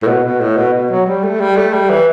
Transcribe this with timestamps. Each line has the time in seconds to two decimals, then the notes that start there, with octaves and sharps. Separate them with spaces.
0.03 A2
0.07 B2
0.24 B2
0.41 A2
0.57 B2
0.74 B2
0.90 F#3
1.06 G3
1.23 A3
1.40 G3
1.57 A3
1.73 G3
1.90 E3